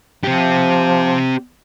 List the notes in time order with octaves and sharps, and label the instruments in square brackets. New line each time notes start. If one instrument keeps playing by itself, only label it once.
[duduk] F3 [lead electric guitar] C4 G4